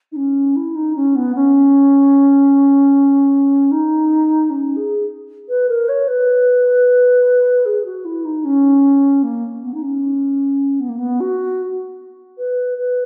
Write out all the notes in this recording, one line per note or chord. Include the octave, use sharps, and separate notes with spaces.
D#4
C#4
E4
D#4
C#4
B3
C#4
D#4
C#4
G#4
B4
A#4
C#5
B4
G#4
F#4
E4
D#4
C#4
A#3
B3
D#4
C#4
B3
A#3
B3
F#4
B4
B4